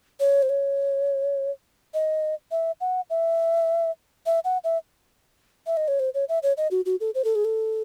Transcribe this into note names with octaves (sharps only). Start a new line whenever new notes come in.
C#5
C5
C#5
D#5
E5
F#5
E5
E5
F#5
E5
E5
D#5
C#5
C5
C#5
E5
C#5
D#5
F#4
F#4
A4
C5
A4
G#4
A4